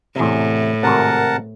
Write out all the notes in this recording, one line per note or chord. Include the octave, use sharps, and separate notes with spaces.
E2 A2 C3
G#1 C3 A#4 F#5 A5